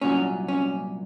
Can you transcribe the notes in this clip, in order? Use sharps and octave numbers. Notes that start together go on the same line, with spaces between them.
C2 A#2 F#3 C#4
C#4